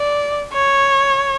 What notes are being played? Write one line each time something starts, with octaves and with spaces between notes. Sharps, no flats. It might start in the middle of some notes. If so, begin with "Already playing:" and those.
Already playing: D5
C#5